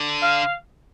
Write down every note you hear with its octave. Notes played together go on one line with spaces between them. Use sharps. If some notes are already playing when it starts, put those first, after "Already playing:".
Already playing: D3
F5